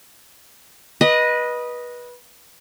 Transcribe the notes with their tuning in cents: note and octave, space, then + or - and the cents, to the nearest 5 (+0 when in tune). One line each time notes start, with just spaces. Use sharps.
B4 -20 D#5 +0